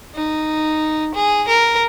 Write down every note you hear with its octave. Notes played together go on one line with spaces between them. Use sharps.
D#4
G#4
A#4